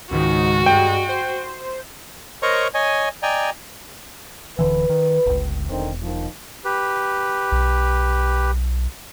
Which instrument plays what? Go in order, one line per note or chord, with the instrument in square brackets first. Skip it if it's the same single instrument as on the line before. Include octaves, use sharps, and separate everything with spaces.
[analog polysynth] C#2 G#2 D#3 [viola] F#4
[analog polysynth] G2 G#3 [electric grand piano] G5
[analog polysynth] C5
[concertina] A#4 C5 C#5 D#5 A#5 C#6
C#5 D#5 G#5
D5 D#5 G5 G#5 A#5
[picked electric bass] D1 D3 E3 [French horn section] B4
[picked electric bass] D#3
G1 C#2
[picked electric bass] E1 [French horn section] D3 D#3 C4
[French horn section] D#3 F3
[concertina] G4 B4
[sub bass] B1